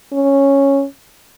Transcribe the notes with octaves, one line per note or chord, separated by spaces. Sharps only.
C#4